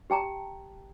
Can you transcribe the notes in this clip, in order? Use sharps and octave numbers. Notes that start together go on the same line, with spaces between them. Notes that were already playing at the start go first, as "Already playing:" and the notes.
G4 G5 A5 A#5